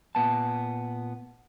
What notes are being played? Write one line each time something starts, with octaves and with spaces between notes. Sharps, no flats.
A#2 B3 A5